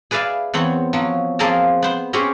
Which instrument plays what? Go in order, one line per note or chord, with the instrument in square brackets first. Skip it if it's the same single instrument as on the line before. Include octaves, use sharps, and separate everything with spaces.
[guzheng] G#4 B4 D5 E5 F5
E2 B3 C4 C#5
F3 F#3
F3 A#3 C4 G#4 A#4 A5
B3 C5
C4 C#4 G4 G#4 C#5